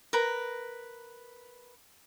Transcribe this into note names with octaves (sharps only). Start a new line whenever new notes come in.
A#4 B4 A#5